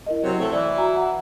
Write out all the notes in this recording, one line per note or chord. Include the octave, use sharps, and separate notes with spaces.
E4 A#4 D#5
C3 F#3
A3 C4
E3 E4 D5
F#4 G#5 A#5
F#5 A#5